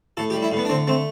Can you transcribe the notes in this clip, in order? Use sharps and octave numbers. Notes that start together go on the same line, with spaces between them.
A2 A4
G4
G3
E4
A2
B3
D4
D3 C4
A3 C4